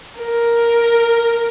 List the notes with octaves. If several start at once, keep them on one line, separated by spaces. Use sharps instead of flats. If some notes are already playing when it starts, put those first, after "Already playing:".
A#4